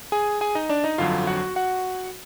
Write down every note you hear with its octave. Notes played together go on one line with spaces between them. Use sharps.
G#4 G#5
G#4 G#5
D#4 D#5
D4 D5
D#4 D#5
G1 F2 D3 F#3 F4 F5
F#4 F#5
F#4 F#5